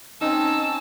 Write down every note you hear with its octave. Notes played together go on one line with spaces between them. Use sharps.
C4 C#4 D#4 A5 E6